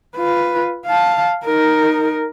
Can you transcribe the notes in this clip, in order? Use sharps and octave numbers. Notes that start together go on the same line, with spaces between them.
F4 B4
F5 A5
D#4 A#4